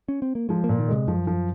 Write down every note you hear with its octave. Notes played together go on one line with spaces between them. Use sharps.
C#4
C4
A#3
F3 G#3
A#3
A#2
D#3
C3 G#3
F#2 F3
F3